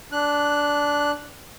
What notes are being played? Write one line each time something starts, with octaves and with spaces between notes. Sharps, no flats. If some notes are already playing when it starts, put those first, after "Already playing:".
D4 F#6